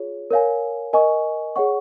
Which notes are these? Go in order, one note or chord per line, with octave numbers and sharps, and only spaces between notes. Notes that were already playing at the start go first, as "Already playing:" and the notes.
Already playing: F4 G#4 C#5
A#4 C#5 F5 G#5
A#4 D#5 G#5 C#6
G#4 C#5 F#5 C#6